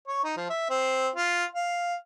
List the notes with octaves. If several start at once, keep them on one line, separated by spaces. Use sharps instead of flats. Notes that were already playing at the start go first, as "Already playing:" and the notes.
C#5
D#4
F3
E5
C4
F4
F5